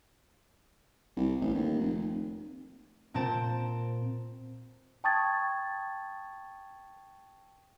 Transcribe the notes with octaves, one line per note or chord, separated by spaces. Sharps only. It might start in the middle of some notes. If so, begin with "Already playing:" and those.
C2
A1
D#2
F1
A#2 C4 C5 A5 D7
G5 A5 C#6 D#6 G#6 A6